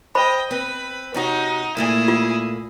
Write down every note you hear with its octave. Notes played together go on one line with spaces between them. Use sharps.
C5 D#5 G5 B5
C4 B4
C3 C#4 D#4 F#4
A#2 A3 A#3 E4 G#4
F4